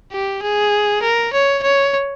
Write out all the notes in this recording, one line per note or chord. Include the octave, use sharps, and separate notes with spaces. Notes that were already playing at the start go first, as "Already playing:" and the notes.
G4
G#4
A#4
C#5
C#5